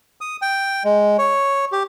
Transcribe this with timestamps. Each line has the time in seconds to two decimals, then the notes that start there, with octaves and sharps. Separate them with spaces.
0.21 D#6
0.42 G5
0.84 G#3
1.18 C#5
1.72 G4